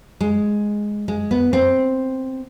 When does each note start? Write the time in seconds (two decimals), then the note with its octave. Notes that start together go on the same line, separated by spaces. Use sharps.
0.21 G#3
1.08 G#3
1.31 B3
1.53 C4